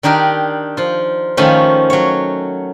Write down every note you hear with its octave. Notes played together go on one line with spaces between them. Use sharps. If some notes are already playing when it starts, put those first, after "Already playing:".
D#3 D4 D#4 G4 A#4
F3 F4
D#3 F3 A3 C#4
F#3 C#5